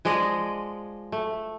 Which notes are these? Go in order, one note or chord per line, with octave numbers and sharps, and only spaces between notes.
F3 G#3 D5 D#5
A3